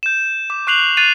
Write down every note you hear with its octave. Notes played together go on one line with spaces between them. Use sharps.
G6 E7
D6
C#6 F#6 C7 F7 F#7
F#6 A6 C7 D#7 F7